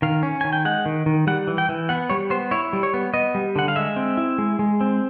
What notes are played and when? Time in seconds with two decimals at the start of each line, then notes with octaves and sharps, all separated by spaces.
0.02 D#3 F5
0.23 C#4
0.41 D#3 G#5
0.53 G5
0.65 G#3 F#5
0.86 D#3
1.06 D#3
1.27 G3 F#5
1.48 E3
1.58 G5
1.69 E3
1.89 B3 F#5
2.10 G3 C#5
2.30 B3 C5
2.51 E4 C#5
2.73 G3
2.83 C#5
2.94 B3
3.14 B3 D#5
3.35 G3
3.56 D3 F#5
3.68 F5
3.76 G#3 E5
3.96 C4
4.17 E4
4.38 G#3
4.59 G#3
4.81 C4